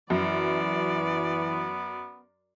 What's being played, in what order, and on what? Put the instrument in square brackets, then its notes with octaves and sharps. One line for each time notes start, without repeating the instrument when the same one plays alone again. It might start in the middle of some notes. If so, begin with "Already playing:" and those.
[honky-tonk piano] F#2 [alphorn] E3 [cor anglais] B3 [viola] D5